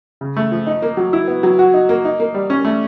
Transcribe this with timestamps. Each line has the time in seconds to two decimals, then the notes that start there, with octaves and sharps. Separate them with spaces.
0.21 C#3
0.37 A3
0.52 F3
0.67 D#4
0.82 A#3
0.97 F#3
1.13 E4
1.28 B3
1.43 F#3
1.59 F#4
1.74 D#4
1.89 A#3
2.05 D#4
2.20 A#3
2.34 G3
2.50 C#4
2.65 A3